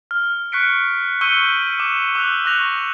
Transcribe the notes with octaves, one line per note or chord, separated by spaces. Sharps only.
F6
C#6 F#6 B6 C#7 D7
C#6 E6 G6 C#7 D#7 G7
D6 E7
D6 E6 F#6 F7
C#6 F#6 A#6 F7